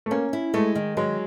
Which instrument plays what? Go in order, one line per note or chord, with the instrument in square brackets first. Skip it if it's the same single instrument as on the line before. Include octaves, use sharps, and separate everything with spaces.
[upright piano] A3
[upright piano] A#3 [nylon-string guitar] C#4
[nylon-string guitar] E4
[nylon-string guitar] G#3 [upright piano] A3
[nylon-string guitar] D#3
[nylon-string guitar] F#3 [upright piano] G#3